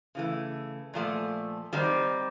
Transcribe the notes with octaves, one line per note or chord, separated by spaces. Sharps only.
C#3 E3 A3
A#2 F3 A3
D#3 G3 C4